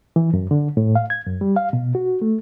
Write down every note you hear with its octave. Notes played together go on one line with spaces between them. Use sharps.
E3
F#2
D3
A2
F5
G#6
F#2
G3
F5
B2
F#4
A3